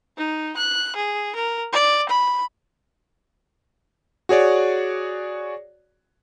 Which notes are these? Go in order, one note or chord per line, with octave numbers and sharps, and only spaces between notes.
D#4
F#6
G#4
A#4
D5
B5
F#4 G#4 C#5 D5